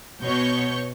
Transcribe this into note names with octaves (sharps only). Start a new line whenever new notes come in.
B2 C#5 C#6 G6